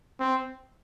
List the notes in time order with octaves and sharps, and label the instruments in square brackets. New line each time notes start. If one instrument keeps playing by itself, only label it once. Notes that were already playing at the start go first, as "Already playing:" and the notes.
[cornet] C4